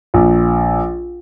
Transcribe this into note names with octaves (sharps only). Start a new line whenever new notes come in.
A#1